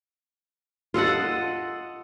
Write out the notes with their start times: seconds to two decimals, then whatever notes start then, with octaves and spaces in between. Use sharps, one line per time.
0.94 F4 A4 D#5 F#5